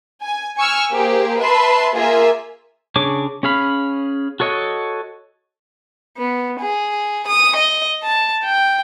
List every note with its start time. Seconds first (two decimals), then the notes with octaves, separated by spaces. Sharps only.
0.23 G#5
0.57 G#5 C#6 E6 F6
0.92 A#3 G4 G#4 C5
1.40 B4 E5 A5 C6
1.96 A#3 F4 G#4 E5 G#5
2.96 C#3 D4 G#4 C#5 D6
3.43 C#4 G#4 F5 B5
4.40 F#4 A4 C#5 D#5
6.17 B3
6.60 G#4
7.27 D#6
7.56 D#5
8.03 A5
8.44 G5